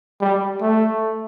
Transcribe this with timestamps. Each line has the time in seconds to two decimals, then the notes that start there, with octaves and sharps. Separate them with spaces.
0.21 G3
0.61 A3